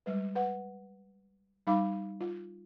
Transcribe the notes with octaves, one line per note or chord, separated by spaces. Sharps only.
G3 G#3 B4
B4 F#5
G3 D#4 F5 B5 D6
F4